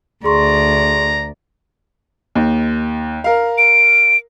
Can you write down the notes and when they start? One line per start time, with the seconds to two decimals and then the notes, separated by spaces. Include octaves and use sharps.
0.24 D2 G#4 D5 A#5 C6 C#6
2.35 D#2
3.24 A#4 F5
3.58 D7